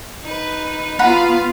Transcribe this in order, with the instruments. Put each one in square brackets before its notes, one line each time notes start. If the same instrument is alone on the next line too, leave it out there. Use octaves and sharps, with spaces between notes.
[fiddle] D#4 B4
[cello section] B3 F4 [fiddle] B4 F5 [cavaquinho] F#5 A#5 B5